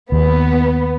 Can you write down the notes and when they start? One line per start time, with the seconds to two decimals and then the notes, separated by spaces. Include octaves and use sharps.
0.12 D#2 B3